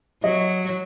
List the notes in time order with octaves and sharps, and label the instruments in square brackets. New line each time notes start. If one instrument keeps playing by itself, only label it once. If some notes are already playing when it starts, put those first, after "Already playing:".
[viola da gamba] F#3 [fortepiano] D#5